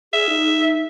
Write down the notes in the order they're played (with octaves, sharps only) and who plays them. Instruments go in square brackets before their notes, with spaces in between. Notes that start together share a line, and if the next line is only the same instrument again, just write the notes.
[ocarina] G#4 [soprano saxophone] E5
[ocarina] D#4